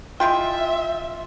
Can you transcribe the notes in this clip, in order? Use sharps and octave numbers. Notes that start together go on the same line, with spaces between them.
G#3 E4 F4 E5 G5